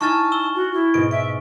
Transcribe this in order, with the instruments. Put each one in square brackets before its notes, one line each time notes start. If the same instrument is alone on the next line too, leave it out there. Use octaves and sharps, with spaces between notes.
[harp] D#4 E4 G#5 [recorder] A5 [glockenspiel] C#6 F6 A6
[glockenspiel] E6 G7 [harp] E7
[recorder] F#4
E4
[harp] G#2 B2 [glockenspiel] D7
[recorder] E5 [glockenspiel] D7